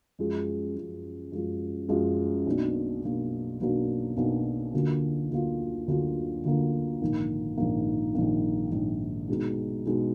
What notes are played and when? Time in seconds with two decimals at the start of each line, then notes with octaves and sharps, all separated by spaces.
0.19 F#2 F3 G#3
0.76 F#2 F3 G#3
1.32 F#2 F3 G#3
1.89 F#2 F3 G#3
2.47 B1 B2 F#3 A#3 D4
3.03 B1 B2 F#3 A#3 D4
3.59 B1 B2 F#3 A#3 D4
4.17 B1 B2 F#3 A#3 D4
4.74 D2 D3 F#3 A#3 F4
5.30 D2 D3 F#3 A#3 F4
5.88 D2 D3 F#3 A#3 F4
6.44 D2 D3 F#3 A#3 F4
7.02 A#1 G#2 D#3 A#3
7.57 A#1 G#2 D#3 A#3
8.15 A#1 G#2 D#3 A#3
8.72 A#1 G#2 D#3 A#3
9.29 B2 G#3 D#4 G#4
9.86 B2 G#3 D#4 G#4